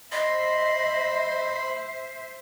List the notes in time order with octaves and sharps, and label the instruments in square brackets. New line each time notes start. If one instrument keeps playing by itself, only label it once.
[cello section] C5 E5 [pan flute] D#5 [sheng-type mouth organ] B5 C6